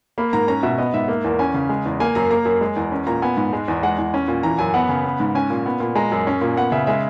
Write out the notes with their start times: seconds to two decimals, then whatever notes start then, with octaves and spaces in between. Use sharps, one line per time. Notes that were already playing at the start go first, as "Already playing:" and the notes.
0.18 A#3 B5
0.33 G#2 A#5
0.48 C#4 A#5
0.63 B2 E5
0.78 B3 D#5
0.94 G#2 E5
1.08 A#3
1.24 E2
1.39 C#4 G#5
1.54 C#3
1.69 G#3
1.85 E2
2.00 A#3 G#5
2.15 F#2 A#5
2.31 A#3 A#5
2.45 F#2
2.61 G#3
2.76 E2
2.92 C#4
3.07 A#2 A#5
3.22 B3 G#5
3.37 G#2
3.53 G#3
3.68 E2
3.83 G#3 F#5
3.98 E2
4.14 C#4
4.28 A#2
4.43 E3 A#5
4.59 F#2 G#5
4.74 B3 F#5
4.89 C#3
5.05 B3
5.20 G#2
5.35 C#4 G#5
5.50 A#2
5.66 B3
5.80 A#2
5.95 G#3 A#5
6.12 F#2
6.27 C#4
6.41 A#2
6.57 B3 F#5
6.72 C#3 E5
6.87 G#3 E5